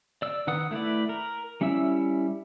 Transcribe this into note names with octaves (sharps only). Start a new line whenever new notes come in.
D5 E6
D#3 B4 F#5 D#6
A3 E4 B4 D5
A#4
G3 C#4 E4 E5 E6